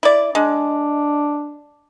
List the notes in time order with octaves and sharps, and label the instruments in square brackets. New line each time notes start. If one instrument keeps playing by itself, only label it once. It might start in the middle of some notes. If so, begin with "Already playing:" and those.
[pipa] E4 D5
[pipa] G#3 [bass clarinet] D4